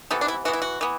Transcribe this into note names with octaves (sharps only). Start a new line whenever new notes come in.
C3 E3 B3 A4
D4
E4
E3 B3 F#4
E4
F#4
E3 B3